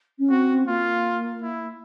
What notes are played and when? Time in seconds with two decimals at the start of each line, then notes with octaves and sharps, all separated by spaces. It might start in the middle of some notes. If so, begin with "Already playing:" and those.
0.19 C#4
0.30 C4 F#4
0.67 A#3 F4
1.42 E4